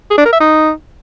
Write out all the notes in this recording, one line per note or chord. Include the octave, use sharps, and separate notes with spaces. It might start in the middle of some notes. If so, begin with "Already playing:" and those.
G#4
D4
A#4
E5
D#4